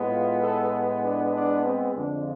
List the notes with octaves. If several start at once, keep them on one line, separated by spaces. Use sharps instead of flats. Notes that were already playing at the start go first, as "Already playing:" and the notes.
Already playing: A2 G#3 B3
F4
A4
D4
D4
C4
F2 D3 F3 G#3 D4